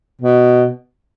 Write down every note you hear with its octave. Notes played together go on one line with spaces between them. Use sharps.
B2